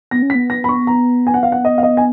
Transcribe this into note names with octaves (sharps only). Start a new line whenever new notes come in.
B3 A#6
C#4
B6
B3
A#6
B5
C#6
A#5
G#5
F#5
F5
F#5
D#5
F5
D#5
G#5